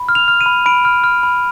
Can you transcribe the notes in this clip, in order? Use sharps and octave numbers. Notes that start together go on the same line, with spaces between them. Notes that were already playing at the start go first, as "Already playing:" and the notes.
Already playing: B5
F6
F7
F6
D#7
B5
B5 D7
F6
F6
B5